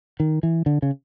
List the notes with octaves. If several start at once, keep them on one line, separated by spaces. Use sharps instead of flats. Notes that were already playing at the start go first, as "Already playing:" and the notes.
D#3
E3
D3
C#3